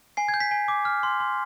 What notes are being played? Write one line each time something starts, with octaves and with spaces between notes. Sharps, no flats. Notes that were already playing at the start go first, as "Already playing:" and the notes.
G#5 C7
G#6
G6
B6
G#5
D6
F6
C6
C6